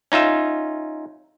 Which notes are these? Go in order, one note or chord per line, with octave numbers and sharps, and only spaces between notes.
C#4 D#4 F4 E5